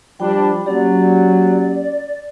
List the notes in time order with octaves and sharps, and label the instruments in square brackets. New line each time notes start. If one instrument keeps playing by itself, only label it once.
[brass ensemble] F3 G3 D4 [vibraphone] G5 B5 D6
[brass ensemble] F#3 [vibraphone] A#3 C#4 G4 [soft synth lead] D5